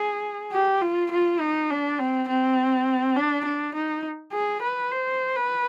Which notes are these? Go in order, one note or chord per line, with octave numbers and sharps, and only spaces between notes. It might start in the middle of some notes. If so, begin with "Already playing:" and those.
Already playing: G#4
G4
F4
F4
D#4
D4
C4
C4
D4
D4
D#4
G#4
B4
C5
B4